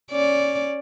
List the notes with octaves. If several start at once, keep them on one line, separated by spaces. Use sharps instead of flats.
C#4 D5